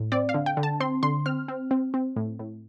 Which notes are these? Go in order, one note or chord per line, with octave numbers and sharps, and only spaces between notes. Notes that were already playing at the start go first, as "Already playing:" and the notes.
Already playing: A2
C4 D5
F5
D3
G5
D3
A5
C4 C6
D3 C6
C4 F6
C4
C4
C4
A2
A2